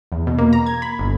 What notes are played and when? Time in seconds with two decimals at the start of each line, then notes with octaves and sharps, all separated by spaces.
0.12 E2
0.27 B2
0.38 A#3
0.53 A#5
0.66 G#6
0.82 B5
0.99 G1